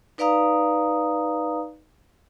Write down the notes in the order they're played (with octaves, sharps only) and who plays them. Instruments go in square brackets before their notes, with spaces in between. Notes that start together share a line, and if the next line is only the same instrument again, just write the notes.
[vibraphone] D#4 B4 D5 F5 A#5 D#6